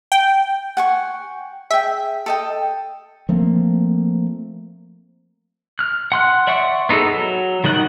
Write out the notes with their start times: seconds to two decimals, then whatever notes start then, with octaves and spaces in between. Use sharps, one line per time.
0.12 G5
0.77 F#5 G#5 C#6
1.71 G#4 E5 G5
2.26 A4 D#5 G5
3.29 F3 A3 A#3 C4
5.79 F6 F#6
6.12 F#5 C6 F#6
6.47 D5 E5 F#5 C6 C#6
6.89 B3 D#4 E4 G#4 A4
7.14 F#3
7.64 D#3 G3 D#4 F#5 F#6